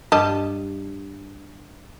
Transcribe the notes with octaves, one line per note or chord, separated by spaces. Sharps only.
G2 G3 D#5 A5